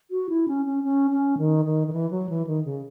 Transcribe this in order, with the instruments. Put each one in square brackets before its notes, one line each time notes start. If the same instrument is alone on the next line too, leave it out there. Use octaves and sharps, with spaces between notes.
[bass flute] F#4
E4
C#4
C#4
C#4
C#4
D#3
D#3
D#3
E3
F#3
E3
D#3
C#3